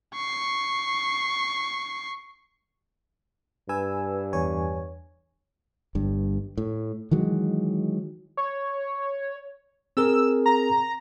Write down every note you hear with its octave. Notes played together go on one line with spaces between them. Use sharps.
C#6 C7
G2 B4 G#5 E6
E2 C#5 G#5
G1 G2
A2
D#3 E3 F#3 G#3
C#5
C4 G#4 A#4 E6
A#5